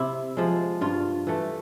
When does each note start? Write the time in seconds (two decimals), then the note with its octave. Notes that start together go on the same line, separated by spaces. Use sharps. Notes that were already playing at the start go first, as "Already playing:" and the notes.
Already playing: C3 E4
0.37 F3 G#3
0.81 G2 F4
1.27 E3 A3